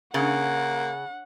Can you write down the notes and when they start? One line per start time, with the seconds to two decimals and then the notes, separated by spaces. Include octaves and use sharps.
0.14 C#3 A#3 F#5